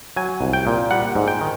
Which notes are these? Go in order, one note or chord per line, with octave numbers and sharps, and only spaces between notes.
F#3 G#5
C2
G5
A#2
G3 F#5
G#2
G5
D#3